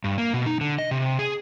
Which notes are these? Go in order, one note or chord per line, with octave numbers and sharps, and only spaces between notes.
G2
A#3
B2
D#4
D3
D#5
C3
G#4